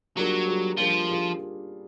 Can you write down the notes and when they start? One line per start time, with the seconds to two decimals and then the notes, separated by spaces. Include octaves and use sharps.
0.17 F#3 G3 A#3 D4 F4 G#4
0.48 G3 A#3 D4 F4 G#4
0.77 F3 G3 A#3 D4 F4 G#4
1.08 G3 A#3 D4 F4 G#4